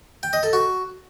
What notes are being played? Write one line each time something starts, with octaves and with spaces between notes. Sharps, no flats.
G5
D#5
A4
F#4